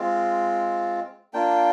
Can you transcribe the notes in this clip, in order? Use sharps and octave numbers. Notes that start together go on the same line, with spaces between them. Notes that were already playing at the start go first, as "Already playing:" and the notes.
Already playing: G#3 C4 F4
A#3 D4 F4 G5